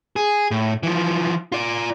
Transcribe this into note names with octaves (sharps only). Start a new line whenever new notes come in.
G#4
A2
E3 F3
F4 D5